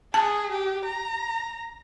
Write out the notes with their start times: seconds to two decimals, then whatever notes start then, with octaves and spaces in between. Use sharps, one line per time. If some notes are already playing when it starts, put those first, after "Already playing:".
0.14 G#4 A5
0.51 G4
0.86 A#5